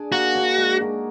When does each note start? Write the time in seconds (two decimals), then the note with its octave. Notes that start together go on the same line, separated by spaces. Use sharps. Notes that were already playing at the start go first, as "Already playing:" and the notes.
Already playing: D4 G#4 D5
0.12 A#3 F#4
0.35 D4 G#4 D5
0.57 G#3
0.80 D#4 F#4 A#4